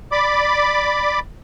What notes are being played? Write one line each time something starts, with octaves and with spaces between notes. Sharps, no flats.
D5 B5 D6